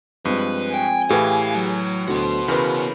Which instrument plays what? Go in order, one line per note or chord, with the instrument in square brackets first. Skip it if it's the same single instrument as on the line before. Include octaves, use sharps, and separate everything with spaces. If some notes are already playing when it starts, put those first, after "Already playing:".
[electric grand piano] G2 [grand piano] F3 G#3 C4 [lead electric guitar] B4
[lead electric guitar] G5 [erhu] G#5
[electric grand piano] A2 E3 [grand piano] G4 G#4 B4 [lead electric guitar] F5
[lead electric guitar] F#3
[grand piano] D2 D3 F#3 [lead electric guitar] B3 F#4 [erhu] C5
[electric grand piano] C#3 E3 C#4 [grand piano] A#4 B4